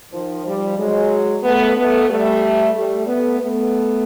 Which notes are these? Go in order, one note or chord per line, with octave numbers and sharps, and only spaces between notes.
D#3 F3
F3 G3
F#3 G#3
A3 B3
A3 B3
G3 A3
G3 A3
A3 B3
A3 B3